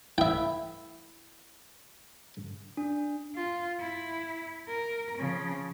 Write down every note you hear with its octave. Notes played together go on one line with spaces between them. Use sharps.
E4 E5 G5
D4
F4
E4
A#4
C#3 F3